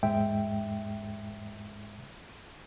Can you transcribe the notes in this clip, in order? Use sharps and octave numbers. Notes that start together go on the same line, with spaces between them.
E2 G#2 G#3 E5 G5